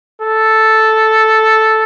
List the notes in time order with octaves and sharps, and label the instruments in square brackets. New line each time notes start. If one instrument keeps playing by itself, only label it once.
[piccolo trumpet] A4